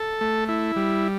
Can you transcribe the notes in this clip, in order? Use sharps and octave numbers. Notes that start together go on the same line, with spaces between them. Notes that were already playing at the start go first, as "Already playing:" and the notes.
Already playing: A4
A3
E4
G3